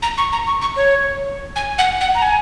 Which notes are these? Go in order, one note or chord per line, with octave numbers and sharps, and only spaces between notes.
A#5
C#6
A#5
C#6
C#6
C#5
G#5
F#5
F#5
A#5
G#5